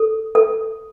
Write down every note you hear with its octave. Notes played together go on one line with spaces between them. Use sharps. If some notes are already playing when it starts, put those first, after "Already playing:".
Already playing: A4
A4